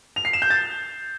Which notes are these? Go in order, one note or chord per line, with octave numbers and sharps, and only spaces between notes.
F7
C7
E7
G6
A6